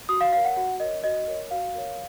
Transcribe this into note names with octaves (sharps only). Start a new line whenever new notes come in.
F#4 D#6
F5
A#4 C#5 F5
F#5
F#4 F#5
A#4 C#5 D#5
F#4 D#5
A#4 C#5
F#4 F5
A#4 C#5